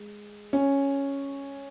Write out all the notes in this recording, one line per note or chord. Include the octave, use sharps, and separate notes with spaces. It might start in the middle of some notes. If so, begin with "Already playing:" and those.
Already playing: G#3
C#4